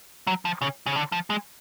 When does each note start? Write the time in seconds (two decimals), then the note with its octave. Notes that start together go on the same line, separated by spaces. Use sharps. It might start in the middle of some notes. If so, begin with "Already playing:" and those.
0.27 F#3
0.45 F3
0.62 C#3
0.86 C#3
0.96 D3
1.12 F3
1.30 G#3